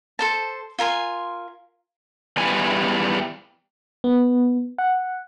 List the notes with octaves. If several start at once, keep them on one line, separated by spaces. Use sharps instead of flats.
A4 C5 A5
F4 A#4 G#5 C6
E2 E3 G3 G#5
B3
F#5